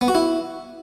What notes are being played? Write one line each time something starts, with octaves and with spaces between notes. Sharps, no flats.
B3
F#4
E4